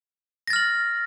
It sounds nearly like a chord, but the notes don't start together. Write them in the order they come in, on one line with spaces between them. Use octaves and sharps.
A#6 A6 F6 F#7